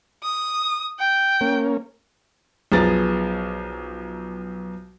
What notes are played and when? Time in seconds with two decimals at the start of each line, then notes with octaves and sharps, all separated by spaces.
0.23 D#6
0.99 G5
1.41 A#3 C#4
2.72 B1 F3 B3 G#4 A#5 A6